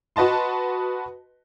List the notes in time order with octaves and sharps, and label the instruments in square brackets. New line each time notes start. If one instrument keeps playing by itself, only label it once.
[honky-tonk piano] F#4 B4 D#5 A5 C6